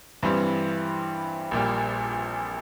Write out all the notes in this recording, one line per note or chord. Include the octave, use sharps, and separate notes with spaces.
G2 E3 G3 C4
A#1 A#2 G3